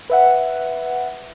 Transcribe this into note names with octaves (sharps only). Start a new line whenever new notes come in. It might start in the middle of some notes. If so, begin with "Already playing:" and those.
B4 E5 F#5